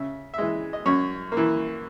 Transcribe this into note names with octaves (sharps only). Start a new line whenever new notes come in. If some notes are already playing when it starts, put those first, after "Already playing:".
Already playing: C#3 E5
E5
E3 G#3 D#5
D#5
F#2 C#5
A#3
E3